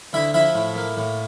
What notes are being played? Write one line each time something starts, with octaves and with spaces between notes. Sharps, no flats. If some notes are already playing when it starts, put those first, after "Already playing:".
D2 E4 E5
F3 E4 E5
A2
A#3
A2